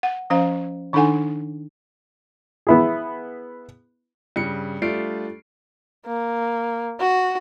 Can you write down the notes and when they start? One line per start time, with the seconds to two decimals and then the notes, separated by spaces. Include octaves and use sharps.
0.03 F#5
0.30 F3 C#4 C5 F5
0.93 D#3 D4 D#4 A4 F#5 G#5
2.67 B3 E4 G#4
4.36 G2 C#3 C#7
4.82 G3 A3 D4 F4 C7 D7
6.06 A#3
7.00 F#4